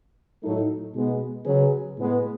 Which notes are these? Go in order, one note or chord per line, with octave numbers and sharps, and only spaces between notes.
A2 F#3 A3 D#4 A4
B2 G#3 B3
C#3 F#3 C#4 G#4 B4
A2 G#3 B3